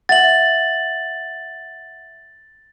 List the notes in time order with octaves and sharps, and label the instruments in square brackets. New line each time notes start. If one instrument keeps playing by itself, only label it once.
[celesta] E5 F#5 [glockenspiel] A6 F#7